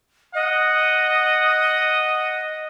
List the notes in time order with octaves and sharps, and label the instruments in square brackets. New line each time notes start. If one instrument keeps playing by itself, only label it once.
[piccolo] D#5 [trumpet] F#5